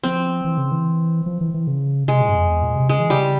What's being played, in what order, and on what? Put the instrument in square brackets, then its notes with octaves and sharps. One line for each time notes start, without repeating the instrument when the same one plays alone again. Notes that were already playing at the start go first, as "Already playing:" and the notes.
[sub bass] F3 [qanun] C4
[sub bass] E3
C#3
E3
F3
E3
E3
C#3
[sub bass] C3 [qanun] G#3
[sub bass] A#2
G2
F2
E2
A#2
C3
[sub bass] C#3 [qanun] G#3
[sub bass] E3
[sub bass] C#3 [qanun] G3